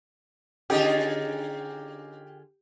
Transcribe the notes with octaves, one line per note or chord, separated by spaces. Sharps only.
D3 C#4 D#4 F4 G4 G#4